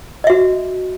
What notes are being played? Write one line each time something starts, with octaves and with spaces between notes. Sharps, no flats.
F#4 D#5 E5